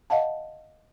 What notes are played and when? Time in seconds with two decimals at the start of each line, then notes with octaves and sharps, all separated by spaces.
0.10 D#5 F5 F#5 A5